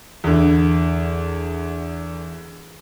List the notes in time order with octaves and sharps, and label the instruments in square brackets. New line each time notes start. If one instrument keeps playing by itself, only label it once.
[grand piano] E2 D3